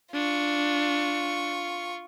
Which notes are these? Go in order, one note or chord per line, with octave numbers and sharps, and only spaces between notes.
D4 F4 C#6